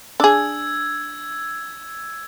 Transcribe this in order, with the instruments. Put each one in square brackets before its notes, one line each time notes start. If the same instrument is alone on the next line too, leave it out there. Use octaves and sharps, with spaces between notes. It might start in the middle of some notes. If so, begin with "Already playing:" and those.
[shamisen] D4 G#4 [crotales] E6 G#6